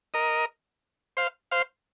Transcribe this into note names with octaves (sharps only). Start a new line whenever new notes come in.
A#4 D#5
C5 F5
C5 F5